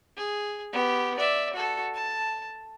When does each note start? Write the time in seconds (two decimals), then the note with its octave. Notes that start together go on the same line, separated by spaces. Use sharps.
0.17 G#4
0.72 B3 G4
1.18 D5 E5
1.54 F#4 A4
1.94 A5